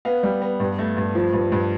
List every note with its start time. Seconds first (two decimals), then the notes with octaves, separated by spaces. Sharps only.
0.05 B3 F5
0.23 G3
0.42 B3
0.60 G2
0.79 A3
0.97 G2
1.15 F3
1.33 G2
1.52 G2